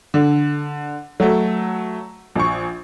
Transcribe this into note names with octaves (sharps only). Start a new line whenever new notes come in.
D3
F#3 A3
A#1 C#6